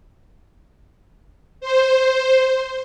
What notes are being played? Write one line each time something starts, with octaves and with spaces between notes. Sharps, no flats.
C5